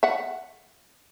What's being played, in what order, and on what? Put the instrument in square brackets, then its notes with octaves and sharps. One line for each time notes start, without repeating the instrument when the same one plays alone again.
[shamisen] E5 F#5